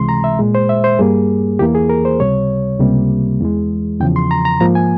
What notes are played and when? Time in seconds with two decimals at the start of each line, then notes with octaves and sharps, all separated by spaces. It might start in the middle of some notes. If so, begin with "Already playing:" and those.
Already playing: C#2 C3 E3 G#3 C6
0.09 A#5
0.24 E5
0.39 A#2 G#3
0.55 C5
0.69 E5
0.84 C5
0.99 G2 G3 A#3 G#4
1.59 E2 E3 A#3 G4
1.75 G#4
1.89 A#4
2.05 C5
2.20 C#2 C3 G3 C#5
2.80 C#2 C3 G3 A#3
3.40 E2 E3 G#3
4.01 E2 C#3 F3 G5
4.16 C6
4.31 A#5
4.45 A#5
4.60 G#2 F3 A#3 A#5
4.75 G#5